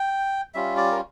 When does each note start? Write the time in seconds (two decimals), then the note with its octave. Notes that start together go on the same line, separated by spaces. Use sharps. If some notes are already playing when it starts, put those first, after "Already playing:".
Already playing: G5
0.54 G3 C#4 F4 E5
0.77 D5
0.92 A#4